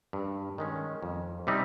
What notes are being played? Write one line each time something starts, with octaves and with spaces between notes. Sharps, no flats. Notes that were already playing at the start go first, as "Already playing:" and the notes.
G2
D#3 G#3 C#4
F2
C3 G3 C4 D#4